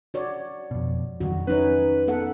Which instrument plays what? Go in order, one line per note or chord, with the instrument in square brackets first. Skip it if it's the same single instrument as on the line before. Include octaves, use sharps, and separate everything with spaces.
[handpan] F#4 C#5 D5
[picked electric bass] F2 B2
[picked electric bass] F2 D#3 F#3 [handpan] F#4
[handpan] C#4 D#4 C#5 [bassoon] B4
[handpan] B3 A4 F#5